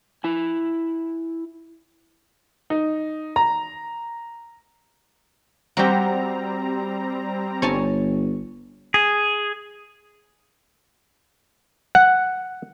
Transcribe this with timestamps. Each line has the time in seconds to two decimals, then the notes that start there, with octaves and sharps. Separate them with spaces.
0.24 E4 G#5
2.70 D#4
3.36 A#5
5.77 G3 C4 F#4 G4 A#5
7.62 G1 C#5 G#5 A5
8.94 G#4
11.95 F#5